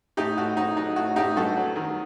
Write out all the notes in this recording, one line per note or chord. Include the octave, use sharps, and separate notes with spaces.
A2 D#4 G4
A2 F#4
F#3 D#4
F#3 D#4
A2 F#4
A2 D#4 G4
G2 F#4 A4
F#3
D#3